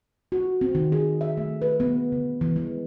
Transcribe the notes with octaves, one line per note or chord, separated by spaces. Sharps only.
F#4
C4
D#3
G#4
E5
A3
B4
B3
D3
E3
G#3